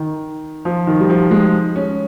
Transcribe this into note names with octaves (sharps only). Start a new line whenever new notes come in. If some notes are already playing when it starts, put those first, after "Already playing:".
Already playing: D#3
F3
D#3
G3
F3
G#3
C#4